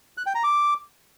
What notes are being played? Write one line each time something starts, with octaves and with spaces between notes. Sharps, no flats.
F#6
G5
A#5
D6